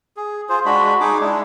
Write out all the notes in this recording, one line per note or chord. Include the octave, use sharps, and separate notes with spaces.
G#4
F4 G#4 C5
G#3 D4 F#4 B5
D#4 G#4 D6
G#3 D4 E4